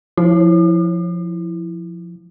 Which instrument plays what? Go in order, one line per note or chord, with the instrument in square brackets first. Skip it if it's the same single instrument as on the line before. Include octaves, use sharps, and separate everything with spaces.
[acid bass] F3 [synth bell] E4